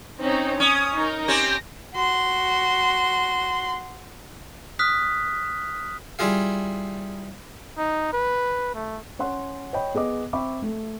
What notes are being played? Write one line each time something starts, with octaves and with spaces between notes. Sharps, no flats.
C4 C#4 D#4
C#4 D#6
D#4 A#4
C4 C#4 G4 A#6
F#4 C6
D#6 F6 F#6 B6
G3 E4 F4 G#4 F5
D#4
B4
A3
C#4 C#5 F#5 C6
C#5 D#5 G5 B5
B3 G#4 D#5 D6
C4 E5 G5 B5 C#6 D6
A3